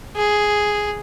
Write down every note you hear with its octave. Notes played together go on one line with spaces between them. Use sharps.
G#4